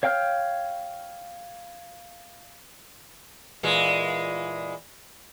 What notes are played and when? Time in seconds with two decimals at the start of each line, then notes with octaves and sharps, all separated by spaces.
0.03 C#5 F5 G5 F6 G6
3.63 A#2 E3 G#3